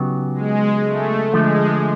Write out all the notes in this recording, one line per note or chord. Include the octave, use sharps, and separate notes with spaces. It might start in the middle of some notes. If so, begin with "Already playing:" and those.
Already playing: C#3 F#3 B3 D#4 G4
G#3
A3
D3 F3 G#3 A3